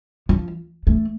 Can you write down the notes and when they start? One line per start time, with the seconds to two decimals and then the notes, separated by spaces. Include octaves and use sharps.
0.29 F3
0.87 A3